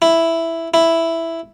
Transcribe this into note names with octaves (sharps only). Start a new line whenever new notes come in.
E4
E4